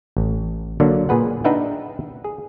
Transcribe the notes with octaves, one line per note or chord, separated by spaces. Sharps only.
A1
D3 F#3 A#3 D4
A#2 G#4 B4 F#5
D4 D#4 B4 E5 F#5 G5
G#4